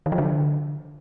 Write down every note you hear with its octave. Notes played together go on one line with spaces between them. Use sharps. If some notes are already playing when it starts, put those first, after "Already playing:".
D#3
F3
D3